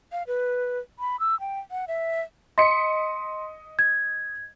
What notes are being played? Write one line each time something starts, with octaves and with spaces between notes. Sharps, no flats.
F5
B4
B5
E6
G5
F#5
E5
D#5 C6 B6 C#7
G#6